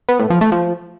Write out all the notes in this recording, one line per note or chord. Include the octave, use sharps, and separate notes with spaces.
B3
A2
F3
A3
F3